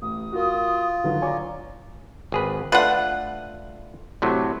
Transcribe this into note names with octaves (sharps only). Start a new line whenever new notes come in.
A1 D#6
F4 F#4 A#4
D3 D#3 F#3 B4
C#5 D5 G#5 A#5 C#6 D6
G#1 G#4 B4
A3 D4 F4 B4 F#5
A2 C3 F#3